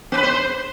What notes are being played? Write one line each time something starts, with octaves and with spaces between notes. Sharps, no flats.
B3
B4
C5